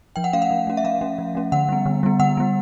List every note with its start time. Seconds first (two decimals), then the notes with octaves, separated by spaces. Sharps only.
0.16 F3 G5
0.24 F#5
0.33 A3 C#4 F5
0.42 F#5
0.51 F3
0.67 A3 C#4
0.77 E5
0.84 F3 F5
1.01 A3 C#4
1.18 F3
1.35 A3 C#4
1.52 D3 F#5
1.69 G3 B3
1.86 D3
2.03 G3 B3
2.19 D3 F#5
2.37 G3 B3